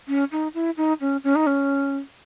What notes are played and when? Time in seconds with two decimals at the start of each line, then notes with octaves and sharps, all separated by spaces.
0.08 C#4
0.32 D#4
0.54 E4
0.77 D#4
1.01 C#4
1.24 C#4
1.36 D#4
1.47 C#4